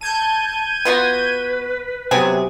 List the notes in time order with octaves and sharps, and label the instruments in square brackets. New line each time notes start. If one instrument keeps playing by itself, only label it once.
[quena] A5 [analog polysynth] G6 G#6 D#7
[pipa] B3 F4 F#4 [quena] B4
[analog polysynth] C3 F#3 [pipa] B3 C4 G#4